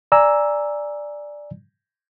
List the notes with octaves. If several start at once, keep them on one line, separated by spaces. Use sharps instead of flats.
D5 G#5 A#5 E6